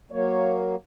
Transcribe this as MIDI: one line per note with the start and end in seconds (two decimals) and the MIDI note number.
0.11 0.76 54
0.11 0.76 58
0.11 0.55 73